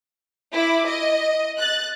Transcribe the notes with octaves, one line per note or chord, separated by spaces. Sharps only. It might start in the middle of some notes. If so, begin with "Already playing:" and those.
E4 D6
D#5
F#6 A6